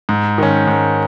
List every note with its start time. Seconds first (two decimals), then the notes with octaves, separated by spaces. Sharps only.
0.09 G#2
0.38 D#3 C#4
0.67 G#2